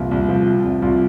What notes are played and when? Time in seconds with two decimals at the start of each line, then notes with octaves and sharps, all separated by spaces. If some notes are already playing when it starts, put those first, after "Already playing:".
Already playing: C2 A#2 F3
0.11 C2
0.29 F3
0.46 C3
0.64 C2
0.82 C2 F4